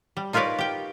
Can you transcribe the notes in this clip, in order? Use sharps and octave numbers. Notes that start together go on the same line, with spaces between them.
G3
D#4 F4 A#4 B4 C#5 D5
G4 G5